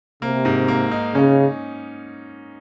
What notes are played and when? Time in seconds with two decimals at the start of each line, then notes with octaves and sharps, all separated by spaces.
0.22 C3 A#3
0.45 G#2
0.68 A#3
0.91 D#4
1.15 C#3 C#4